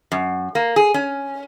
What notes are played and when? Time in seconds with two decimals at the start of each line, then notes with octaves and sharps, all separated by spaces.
0.12 F#2
0.55 A#3
0.76 G#4
0.94 C#4